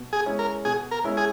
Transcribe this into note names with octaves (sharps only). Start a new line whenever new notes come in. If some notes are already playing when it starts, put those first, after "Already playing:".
Already playing: B2
G#4
G#3 C#4 E4
A#4
B2 G#4
A#4
G#3 C#4 E4
G#4